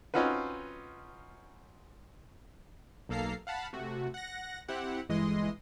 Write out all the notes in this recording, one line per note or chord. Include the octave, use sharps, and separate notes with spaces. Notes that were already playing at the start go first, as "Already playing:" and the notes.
C4 C#4 D#4 F4 F#4 B4
B1 A#3 A4 F5 A#5 C7
F5 F#5 A5 B5
C3 A3 F#4
F#5 A#6
C4 E4 G4 F#5
G1 E3 G#3 D#5 C6